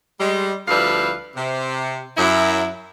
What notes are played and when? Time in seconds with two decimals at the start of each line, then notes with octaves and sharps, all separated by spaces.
0.19 G3 G#3
0.68 D2 F3 G3 E4 B4 F5
1.36 C3
2.17 F#2 E4